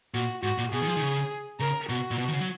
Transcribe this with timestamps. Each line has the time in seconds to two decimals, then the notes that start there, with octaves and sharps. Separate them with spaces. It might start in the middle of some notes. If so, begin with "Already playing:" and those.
0.14 A#2 F#4
0.43 G#2 F#4
0.58 A#2
0.72 B2 G#4
0.82 D#3
0.87 F3
0.97 D#3
1.02 C#3
1.60 C#3 A#4
1.89 B2 F#4
2.11 A#2
2.18 B2
2.28 D#3
2.33 C#3
2.41 F#3